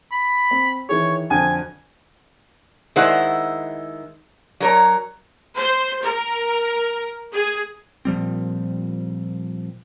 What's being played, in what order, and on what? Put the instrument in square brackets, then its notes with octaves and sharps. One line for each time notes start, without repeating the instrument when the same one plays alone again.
[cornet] B5
[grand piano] C4
[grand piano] D#3 E3 G#4 [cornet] C#5
[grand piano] F2 D3 F#4 [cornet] G#5
[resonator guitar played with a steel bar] D#3 G#3 E4 C5 F#5
F#3 F#4 A#4 C#5 A#5
[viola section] C5
A#4
G#4
[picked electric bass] A#2 F3 G3 C4